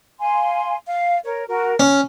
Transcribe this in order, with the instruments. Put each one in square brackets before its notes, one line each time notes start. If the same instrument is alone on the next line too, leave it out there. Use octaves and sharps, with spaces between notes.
[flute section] F5 G#5 C6
F5
A#4 C#5
F#4 A#4
[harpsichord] C#4 [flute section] F6